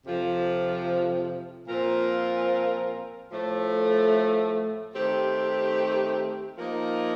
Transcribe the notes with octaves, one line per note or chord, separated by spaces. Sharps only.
F2 C3 F3
A#2 F3 C4 F4 A#4
A2 F3 A3
D#3 A3 C4 G4
F3 A#3 D#4 A#4